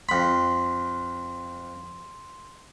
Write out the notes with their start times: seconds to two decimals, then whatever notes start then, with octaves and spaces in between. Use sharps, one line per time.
0.09 F2 B5 C6